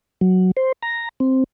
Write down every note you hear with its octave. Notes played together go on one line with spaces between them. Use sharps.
F#3
C5
A#5
C4